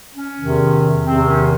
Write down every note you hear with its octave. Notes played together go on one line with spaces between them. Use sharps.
C#4
E2 C3 D#3
E2 C3 D#3 C4
C#4